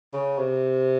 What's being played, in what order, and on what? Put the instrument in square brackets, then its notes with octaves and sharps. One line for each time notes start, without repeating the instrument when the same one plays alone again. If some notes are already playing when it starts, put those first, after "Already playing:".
[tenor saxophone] C#3
C3